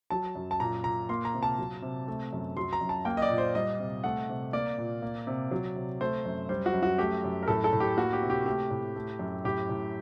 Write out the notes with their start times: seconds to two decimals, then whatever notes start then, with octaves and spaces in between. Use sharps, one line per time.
0.10 F#3 A5
0.35 F#2
0.51 A5
0.60 A#2 A#5
0.84 A#2 A#5
1.09 A#3 C6
1.25 A#5
1.34 C3
1.43 A5
1.58 F#3
1.82 C3
2.08 A3
2.33 F#2
2.57 F#3 C6
2.73 A#5
2.81 F#2
2.89 A5
3.05 A#3 G5
3.17 D#5
3.22 D5
3.30 A#2
3.38 C5
3.55 G3 D#5
3.80 C3
4.04 A3 F#5
4.29 C3
4.53 A#3 D5
4.78 A#2
5.02 A#3
5.27 C3
5.51 F#3
5.75 C3
6.01 A3 C5
6.25 F#2
6.49 G3 C5
6.66 F#4
6.74 F#2
6.83 F#4
6.98 A3 G4
7.24 F#2
7.43 A#4
7.48 A2 A4
7.64 A4
7.73 A2
7.80 G4
7.97 A#3 F#4
8.13 G4
8.22 C3
8.30 G4
8.46 A3 G4
8.71 A2
8.96 A3
9.19 F#2
9.44 A2 G4
9.69 A2